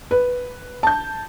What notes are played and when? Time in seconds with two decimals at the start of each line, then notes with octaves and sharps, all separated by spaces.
0.11 B4
0.83 A5 G6